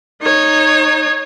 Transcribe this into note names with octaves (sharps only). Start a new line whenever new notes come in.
D#4 C#5